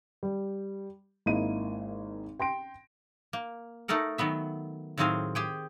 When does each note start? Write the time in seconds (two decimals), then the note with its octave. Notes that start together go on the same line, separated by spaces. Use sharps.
0.23 G3
1.26 G#1 A#3 E4 D#5 D#7
2.40 G5 C6 A#6 D7
3.33 A#3
3.88 A3 D#4 A4 A#4 F#5
4.18 D#3 F#3 B3 E5
4.98 A2 D#3 F#3 C4 G#4 F5
5.35 G4 G#4 G5